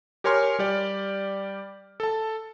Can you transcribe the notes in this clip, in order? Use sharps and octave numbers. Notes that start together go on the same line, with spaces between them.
G4 A#4 C#5 G#5 C6 F6
G3 G4 D5
A4 A5